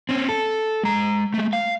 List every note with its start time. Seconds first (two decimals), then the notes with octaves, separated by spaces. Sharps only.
0.09 C4 C#4
0.29 A4
0.83 G#3 A#5
1.34 G#3 A3
1.53 F5